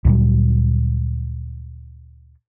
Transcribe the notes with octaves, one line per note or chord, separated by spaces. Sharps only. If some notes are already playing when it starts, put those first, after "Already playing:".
D2 A#2 F#3 G3